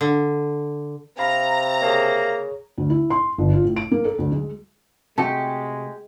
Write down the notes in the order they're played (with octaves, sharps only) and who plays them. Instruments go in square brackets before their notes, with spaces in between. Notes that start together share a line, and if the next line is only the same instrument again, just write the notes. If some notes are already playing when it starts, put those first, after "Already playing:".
[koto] D3
[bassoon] C3 [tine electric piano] F5 B5 [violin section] A#5
[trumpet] A#3 [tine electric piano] G#4 C#5
[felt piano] D2
E4
C6
G1
F4
A2
D7
A#3
A4
D2
G#3
[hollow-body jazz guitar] C3 A3 F#4 [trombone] G#3 [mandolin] G4 [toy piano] A5